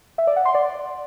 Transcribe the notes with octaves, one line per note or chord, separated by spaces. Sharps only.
E5
D5
F#5
C6
D5